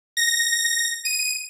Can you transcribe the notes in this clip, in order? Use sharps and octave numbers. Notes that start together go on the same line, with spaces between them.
A#6
D#7